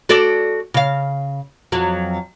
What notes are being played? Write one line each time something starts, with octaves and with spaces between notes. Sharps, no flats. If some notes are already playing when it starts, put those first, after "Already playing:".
F#4 A4 D5
C#3 F5
F2 F#3